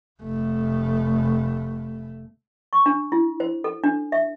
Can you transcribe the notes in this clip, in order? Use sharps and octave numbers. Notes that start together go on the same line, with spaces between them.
F1 A3
C#6
D4
E4
C5
A4
D4
E5